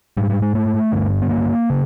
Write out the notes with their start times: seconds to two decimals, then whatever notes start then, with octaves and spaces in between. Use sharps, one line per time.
0.17 G#2 G3
0.30 G3
0.42 G#3
0.55 A3
0.92 G2 D3
1.21 B3
1.29 A#3
1.70 C#3